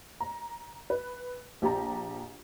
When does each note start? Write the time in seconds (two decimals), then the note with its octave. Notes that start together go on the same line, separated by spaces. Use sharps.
0.20 A#5
0.90 B4
1.62 A#1 G4 G5 A5 A#5